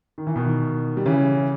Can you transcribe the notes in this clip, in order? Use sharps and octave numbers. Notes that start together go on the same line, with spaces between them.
D#3
E3
B2 D#3
G3
C#3 E3